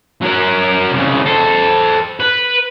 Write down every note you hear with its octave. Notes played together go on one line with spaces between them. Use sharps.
F#3 A#4
C2 C#3
A4 C5
B4